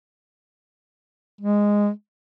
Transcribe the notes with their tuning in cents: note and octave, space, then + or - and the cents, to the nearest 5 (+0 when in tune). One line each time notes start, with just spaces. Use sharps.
G#3 -10